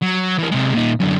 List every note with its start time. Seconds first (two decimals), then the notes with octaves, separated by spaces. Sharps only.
0.02 F#3
0.39 E3 A#3
0.52 C3 G#3
0.74 A#2 D#4
1.00 F#2 D3